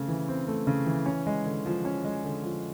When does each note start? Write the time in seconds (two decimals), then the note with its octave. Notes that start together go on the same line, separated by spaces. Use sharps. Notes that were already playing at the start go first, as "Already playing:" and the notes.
Already playing: C#3 A3 C4
0.08 E3
0.28 C4
0.48 A3
0.67 C#3
0.86 E3
1.06 C#4
1.27 G#3
1.46 D3
1.66 F3
1.85 C#4
2.04 G#3
2.24 D3
2.43 F3